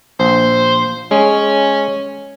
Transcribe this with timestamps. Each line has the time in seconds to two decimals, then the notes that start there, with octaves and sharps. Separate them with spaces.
0.20 A#1 C5
1.11 G#3 C#4